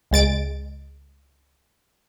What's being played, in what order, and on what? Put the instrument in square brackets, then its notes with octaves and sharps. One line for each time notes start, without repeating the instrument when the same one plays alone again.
[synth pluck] C#2 G#3 A6 D7